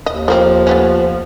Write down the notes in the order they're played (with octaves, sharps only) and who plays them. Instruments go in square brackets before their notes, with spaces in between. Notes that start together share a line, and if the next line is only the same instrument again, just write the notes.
[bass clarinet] D#2 [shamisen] D#5
[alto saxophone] F3 [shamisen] A3 A#3 C4
[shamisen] A3 B3 C#4